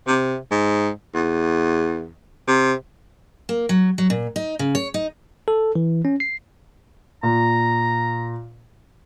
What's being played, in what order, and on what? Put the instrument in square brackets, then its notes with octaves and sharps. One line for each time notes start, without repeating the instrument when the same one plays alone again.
[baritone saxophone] C3
G#2
E2
C3
[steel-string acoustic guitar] A#3
F#3
F#3
A#2
D#4
C#3
C#5
D#4
[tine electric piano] A4
E3
C#4
C7
[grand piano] A#2 [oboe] A#5